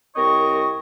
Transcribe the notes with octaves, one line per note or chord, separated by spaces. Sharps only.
C2 C4 A#4 C#5 D#5 C#6